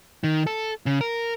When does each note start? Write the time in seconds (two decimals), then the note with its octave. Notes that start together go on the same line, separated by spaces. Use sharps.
0.24 D#3
0.47 A4
0.86 C#3
1.01 A#4